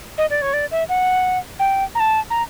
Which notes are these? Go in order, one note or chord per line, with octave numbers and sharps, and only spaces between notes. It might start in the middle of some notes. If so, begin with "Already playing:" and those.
D#5
D5
C#5
D5
E5
F#5
G5
A#5
A5
A#5